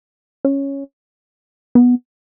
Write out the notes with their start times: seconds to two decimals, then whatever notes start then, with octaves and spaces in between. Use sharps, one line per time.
0.45 C#4
1.75 B3